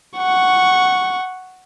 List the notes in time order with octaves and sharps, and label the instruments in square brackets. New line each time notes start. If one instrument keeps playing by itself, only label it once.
[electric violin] F#5 C#6